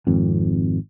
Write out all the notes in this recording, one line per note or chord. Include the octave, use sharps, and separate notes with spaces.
G#1 F2